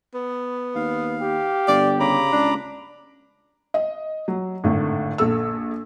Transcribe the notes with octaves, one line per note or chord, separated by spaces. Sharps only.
B3
D#2 F5
G4
G1 D5
C#3 A#5 B5 D6
C#2 D4
D#5
F#3
G#1 A2 D3
A#1 A4 E6